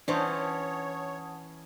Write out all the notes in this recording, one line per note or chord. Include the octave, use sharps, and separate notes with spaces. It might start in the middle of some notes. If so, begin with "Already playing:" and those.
E3 C#4 D4 C5 C#5 F#5 A5 D#6